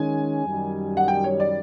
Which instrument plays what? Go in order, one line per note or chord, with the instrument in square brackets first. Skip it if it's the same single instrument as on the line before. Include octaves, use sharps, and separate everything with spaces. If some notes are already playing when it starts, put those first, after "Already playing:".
Already playing: [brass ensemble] D#3 G#3 C#4 [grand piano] G#5
[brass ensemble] F#2 D#3 G3
[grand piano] F#5
G5
C#5
D5